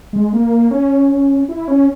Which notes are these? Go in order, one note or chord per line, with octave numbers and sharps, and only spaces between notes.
G#3
A#3
C#4
E4
C#4